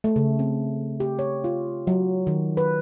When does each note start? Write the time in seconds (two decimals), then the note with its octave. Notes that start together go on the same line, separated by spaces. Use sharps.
0.04 A3
0.16 C#3
0.39 C4
1.00 G4
1.19 C#5
1.44 F4
1.87 F#3
2.27 D#3
2.57 B4